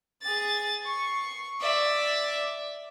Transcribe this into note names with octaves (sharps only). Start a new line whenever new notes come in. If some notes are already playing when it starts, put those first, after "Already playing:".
G#4 A6
C#6 C7
D5 E5